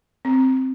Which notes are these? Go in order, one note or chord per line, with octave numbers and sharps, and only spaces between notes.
C4